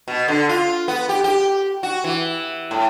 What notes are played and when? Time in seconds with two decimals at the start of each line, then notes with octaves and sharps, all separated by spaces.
0.08 B2
0.28 D3
0.49 F4
0.88 B3
1.09 G4
1.24 G4
1.83 F#4
2.04 E3
2.71 A2